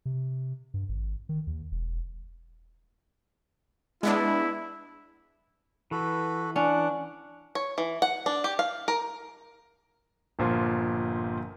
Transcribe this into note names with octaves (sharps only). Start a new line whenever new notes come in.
C3
G2
G#1
D#3
D#2
E1
G#3 B3 D4 E4
E3 F#4 A4 B4
C#4 D4 F#5
C#5
E3
F#5
D4
G4
F5
A#4
G1 A#2 F3 C6